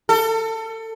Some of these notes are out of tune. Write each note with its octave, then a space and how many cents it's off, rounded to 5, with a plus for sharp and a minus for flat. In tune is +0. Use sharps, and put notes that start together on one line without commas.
A4 +25